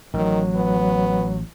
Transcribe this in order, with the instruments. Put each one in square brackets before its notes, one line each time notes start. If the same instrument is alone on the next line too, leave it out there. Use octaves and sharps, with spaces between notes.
[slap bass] A1 [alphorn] D#3 [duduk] F#3
[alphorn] B3